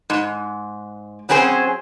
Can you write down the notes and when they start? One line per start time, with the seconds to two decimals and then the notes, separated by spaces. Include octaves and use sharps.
0.10 G#2
1.29 F#3 C4 C#4 G#4 C5